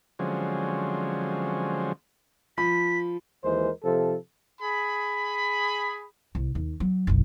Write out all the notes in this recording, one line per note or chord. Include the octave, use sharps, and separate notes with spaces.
D3 F3 F#3 G#3 C4 C#4
F3 B5 B6
D#2 E3 G#3 A#4 C5
C3 F3 A4
G#4 B5
C2
D#2
F#3
F#1 B1